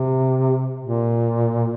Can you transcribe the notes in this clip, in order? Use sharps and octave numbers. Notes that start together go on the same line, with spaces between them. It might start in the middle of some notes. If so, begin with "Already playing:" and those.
Already playing: C3
A#2